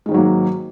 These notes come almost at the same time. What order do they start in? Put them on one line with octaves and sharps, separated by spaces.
G#3 D#3 G#2 F#3 A#3